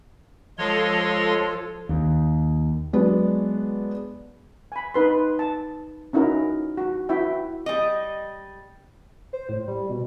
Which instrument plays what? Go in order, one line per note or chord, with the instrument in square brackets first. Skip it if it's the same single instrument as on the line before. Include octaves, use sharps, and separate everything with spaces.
[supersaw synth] F3 A4 [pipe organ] G#3 C#5 C6
[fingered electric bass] D#2
[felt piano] F#3 G#3 B3 D4
[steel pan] G#5 B5
D#4 B4 C6
A5
C#4 D#4 E4 F#4 A#4
F#4
E4 F#4 E5 G5
[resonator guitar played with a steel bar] G3 D#5
[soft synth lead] C5
A2
G3
B2